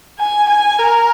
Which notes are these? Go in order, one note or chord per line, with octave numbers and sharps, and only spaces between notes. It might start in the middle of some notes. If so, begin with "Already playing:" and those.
G#5
G#5
A#4